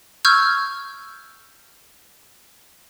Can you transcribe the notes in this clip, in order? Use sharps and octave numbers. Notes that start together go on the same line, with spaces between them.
C#6 E6 F6 G6 G#6